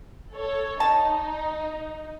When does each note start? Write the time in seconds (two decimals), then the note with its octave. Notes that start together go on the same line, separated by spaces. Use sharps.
0.33 A4 C#5
0.80 D#4 A5